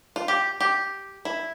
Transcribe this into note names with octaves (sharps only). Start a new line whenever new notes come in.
F4
G4
G4
E4